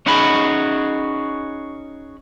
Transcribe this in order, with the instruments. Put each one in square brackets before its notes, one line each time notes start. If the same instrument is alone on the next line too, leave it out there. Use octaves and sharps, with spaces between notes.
[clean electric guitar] C#4 D#4 F#4 G#4 B5